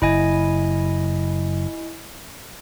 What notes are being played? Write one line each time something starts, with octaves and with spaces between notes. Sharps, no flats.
F#1 E4 D#5 G#5